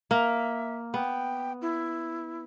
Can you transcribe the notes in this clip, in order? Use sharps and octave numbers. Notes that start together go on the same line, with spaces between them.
A#3 A#4 E5
B3 G5
E4